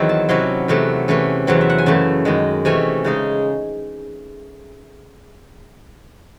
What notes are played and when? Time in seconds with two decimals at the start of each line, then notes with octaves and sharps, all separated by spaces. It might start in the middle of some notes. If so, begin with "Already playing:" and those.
Already playing: E2 D#3 F#3 C4 E4
0.09 A5
0.29 C3 F#3 C#4 E4 C6
0.68 E2 C3 F#3 A3
1.08 C3 E3 A3 C#4
1.47 E2 C3 F#3 C4
1.61 E5
1.70 F#5
1.78 G#5
1.86 F#2 C#3 E3 A3 A5
2.25 F#2 D#3 G#3
2.65 C3 E3 A3 C#4 G#5
3.04 C#3 G#3 D#4